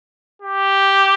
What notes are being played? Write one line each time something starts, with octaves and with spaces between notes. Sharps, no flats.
G4